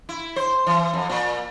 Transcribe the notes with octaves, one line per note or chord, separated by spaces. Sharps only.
E4
C5
E3
F2
A#2